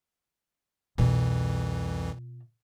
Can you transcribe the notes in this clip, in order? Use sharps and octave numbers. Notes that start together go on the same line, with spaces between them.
C2 F2 B2 E3 F4